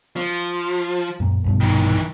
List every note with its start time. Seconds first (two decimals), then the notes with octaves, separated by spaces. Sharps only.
0.16 F3
1.20 F#2 A#2
1.44 A#1 G2 B2
1.61 D#3 E3